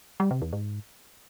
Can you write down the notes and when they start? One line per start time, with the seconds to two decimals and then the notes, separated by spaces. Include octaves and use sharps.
0.20 G3
0.31 C3
0.42 E2
0.53 G#2